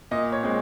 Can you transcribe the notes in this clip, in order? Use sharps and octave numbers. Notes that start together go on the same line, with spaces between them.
A#2 D#5
C#5
G#3 C4